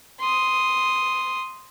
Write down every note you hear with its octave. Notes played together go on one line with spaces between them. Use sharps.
C6 D#6